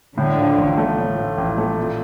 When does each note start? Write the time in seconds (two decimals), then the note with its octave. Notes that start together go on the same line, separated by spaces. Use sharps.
0.18 A2 D3
0.38 F3
0.58 A1
0.77 A3
0.98 A2
1.18 F3
1.38 A1
1.58 A3
1.78 A#2